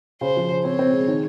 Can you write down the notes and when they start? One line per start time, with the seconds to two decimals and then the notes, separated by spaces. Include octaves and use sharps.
0.21 C#3 C5
0.37 F3
0.50 C#3
0.64 C4 C#5
0.79 C4
0.93 G#3
1.08 D#3